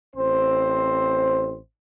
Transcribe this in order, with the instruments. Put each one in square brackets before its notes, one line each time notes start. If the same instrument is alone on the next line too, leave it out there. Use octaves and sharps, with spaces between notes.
[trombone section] A1 C4 C5